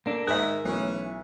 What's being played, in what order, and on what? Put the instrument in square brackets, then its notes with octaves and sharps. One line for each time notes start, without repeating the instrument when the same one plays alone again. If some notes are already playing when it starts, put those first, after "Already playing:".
[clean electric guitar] A#3 D4 A4 [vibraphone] A#4
[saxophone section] G#2 D#3 [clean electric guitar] G#4 [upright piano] E5 F#6
[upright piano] B1 [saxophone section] E3 C#4 [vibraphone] A3 E5 D#6
[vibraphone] B4 E5